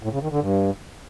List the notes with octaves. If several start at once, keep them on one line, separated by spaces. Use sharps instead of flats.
A2
C#3
D#3
D3
G2